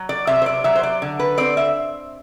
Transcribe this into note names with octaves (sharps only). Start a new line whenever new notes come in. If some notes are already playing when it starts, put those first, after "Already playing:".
Already playing: F#3
D5
C3 E5
C5
D5
F#3 E5
C5
D5
D3
B4
C4 D5
E5